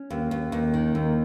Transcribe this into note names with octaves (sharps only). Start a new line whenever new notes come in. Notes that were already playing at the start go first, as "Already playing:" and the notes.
Already playing: C#4
D#2
D#2
D#2
D#3
D#2